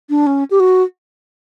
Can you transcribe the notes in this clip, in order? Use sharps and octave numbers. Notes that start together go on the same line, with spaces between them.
D4
C#4
G4
F#4